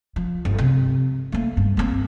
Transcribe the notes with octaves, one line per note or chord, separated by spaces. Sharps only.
F3
G1
C3
A3 A#3
G2
A#3 C4